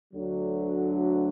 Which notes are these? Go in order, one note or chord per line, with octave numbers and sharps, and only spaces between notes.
D2 D3 F#3